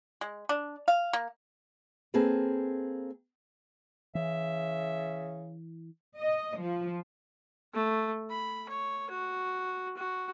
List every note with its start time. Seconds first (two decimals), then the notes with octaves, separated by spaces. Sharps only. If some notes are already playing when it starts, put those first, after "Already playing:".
0.21 G#3
0.49 D4
0.88 F5
1.13 A#3
2.14 A#3 C4 G#4 A4 B4
4.15 C#3 E3 E5
6.19 D#5
6.59 F3
7.74 A3
8.30 B5
8.69 C#5
9.10 F#4
9.96 F#4